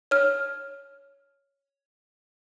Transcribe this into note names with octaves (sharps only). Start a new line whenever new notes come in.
C#5 F6